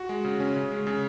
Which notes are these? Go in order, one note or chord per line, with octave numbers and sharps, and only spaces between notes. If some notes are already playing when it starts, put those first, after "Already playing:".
Already playing: F#4
G#3
C#3
C#4
C#3
G#3
C#3